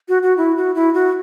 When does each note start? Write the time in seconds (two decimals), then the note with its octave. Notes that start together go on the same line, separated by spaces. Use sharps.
0.09 F#4
0.23 F#4
0.38 E4
0.57 F#4
0.75 E4
0.94 F#4